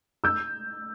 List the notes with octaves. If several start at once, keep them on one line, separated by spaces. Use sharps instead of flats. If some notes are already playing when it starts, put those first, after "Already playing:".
E6 G6